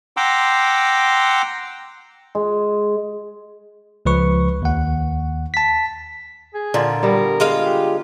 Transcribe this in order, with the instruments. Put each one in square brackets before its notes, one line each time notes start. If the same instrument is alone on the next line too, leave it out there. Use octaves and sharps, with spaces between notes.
[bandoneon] F#5 G5 A#5 C6 D6 E6
[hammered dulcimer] G#3
[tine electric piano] C#2 F3 B4 C#6
D#2 F#5
A5 B6
[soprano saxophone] G#4
[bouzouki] A#2 [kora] D3 F4
[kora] G3 B3 [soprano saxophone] A#4
[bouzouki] G#3 F4 F5
[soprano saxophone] G4